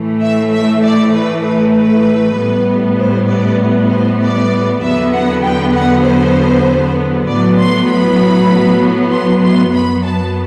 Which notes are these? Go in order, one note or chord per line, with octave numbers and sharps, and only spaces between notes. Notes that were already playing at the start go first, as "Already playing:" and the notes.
Already playing: A2 E3 A3
E5
E5
D5
B4
B4
B4
A2 G3 B3
C5
D5
C5
D5
E2 D3 F#3 B3 E5
F#5
G5
F#5
C5
A2 F#3 B3 D5
C6
B5
C6
C6
F#2 F#3 B3 B5
A5